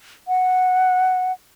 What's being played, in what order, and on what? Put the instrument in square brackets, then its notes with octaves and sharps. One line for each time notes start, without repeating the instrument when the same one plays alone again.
[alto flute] F#5